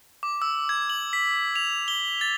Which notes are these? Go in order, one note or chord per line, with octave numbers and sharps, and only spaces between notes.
D6
E6
G#6
F#7
B6
F7
G7
A6